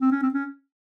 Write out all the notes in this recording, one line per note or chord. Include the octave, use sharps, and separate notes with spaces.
C4
C#4
C4
C#4